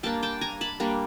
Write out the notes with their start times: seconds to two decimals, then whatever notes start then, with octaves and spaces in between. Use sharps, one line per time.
0.03 G3 A#3 D4 G5 A5
0.23 G5 A5
0.41 G#5 A#5
0.61 A5 B5
0.80 G3 A#3 D4